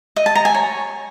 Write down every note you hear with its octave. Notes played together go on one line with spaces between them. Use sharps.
D#5
A5
A#5
G#5
C#5